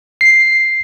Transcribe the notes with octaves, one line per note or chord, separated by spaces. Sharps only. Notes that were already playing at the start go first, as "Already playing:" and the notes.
C7